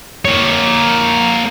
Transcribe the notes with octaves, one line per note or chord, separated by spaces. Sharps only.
A#3 C#5